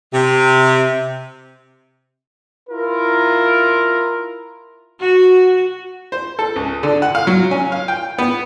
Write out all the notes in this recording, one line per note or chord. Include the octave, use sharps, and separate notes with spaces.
C3
E4 F4 A#4
F#4
C5
A4
C#2
D3
F#5
F5
F#3
C#4
F5
G5
B3